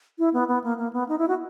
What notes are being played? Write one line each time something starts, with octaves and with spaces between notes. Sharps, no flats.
E4
B3
B3
A#3
A#3
B3
D#4
E4
F#4